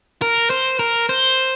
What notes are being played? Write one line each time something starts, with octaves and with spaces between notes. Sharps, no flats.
A#4
C5
A#4
C5